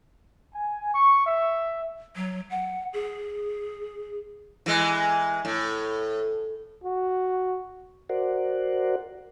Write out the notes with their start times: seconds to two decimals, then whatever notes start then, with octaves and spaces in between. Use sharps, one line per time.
0.54 G#5
0.93 C#6
1.26 E5
2.16 F#3
2.50 F#5
2.93 G#4
4.66 E3 G#3
5.45 A2
6.84 F#4
8.09 F#4 A#4 C5 D5 F#5